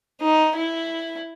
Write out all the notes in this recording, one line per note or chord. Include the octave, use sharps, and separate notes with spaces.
D#4
E4